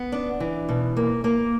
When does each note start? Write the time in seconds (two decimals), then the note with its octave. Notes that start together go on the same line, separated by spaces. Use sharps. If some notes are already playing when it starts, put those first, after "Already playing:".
Already playing: B3
0.12 D4
0.40 E3
0.69 B2
0.97 A#3
1.24 A#3